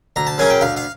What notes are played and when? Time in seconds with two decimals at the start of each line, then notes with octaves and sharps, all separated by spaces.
0.16 D2 A#5
0.27 A5
0.38 C#3 F#3 A#3 C#4 G#5
0.50 G5
0.61 D2 F5
0.77 F5